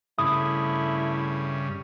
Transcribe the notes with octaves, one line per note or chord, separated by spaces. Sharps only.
G2 C#3 A3 E4 D#6